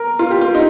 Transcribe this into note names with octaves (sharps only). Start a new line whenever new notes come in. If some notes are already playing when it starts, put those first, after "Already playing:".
Already playing: A#4
F4
G4
F4
D#4